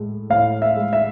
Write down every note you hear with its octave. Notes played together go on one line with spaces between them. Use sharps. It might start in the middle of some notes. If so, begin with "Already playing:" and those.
Already playing: A2 G#3
A2 F5
E5
G#3
E5